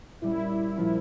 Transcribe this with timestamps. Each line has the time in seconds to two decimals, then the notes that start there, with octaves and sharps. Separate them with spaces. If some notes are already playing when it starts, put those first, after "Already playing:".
0.21 A#2 G3 C#4 E4
0.77 A#2 F3 C#4